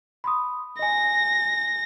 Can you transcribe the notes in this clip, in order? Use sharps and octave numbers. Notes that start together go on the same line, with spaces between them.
B5 C6 D#6
D#5 G#5 A#6